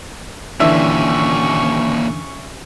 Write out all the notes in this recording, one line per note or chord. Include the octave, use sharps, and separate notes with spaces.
D#2 A#2 D3 E3 C#4 D4 E5 C#6